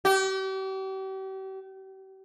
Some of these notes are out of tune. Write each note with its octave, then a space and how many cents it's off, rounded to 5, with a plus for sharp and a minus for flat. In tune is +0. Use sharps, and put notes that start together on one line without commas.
G4 -40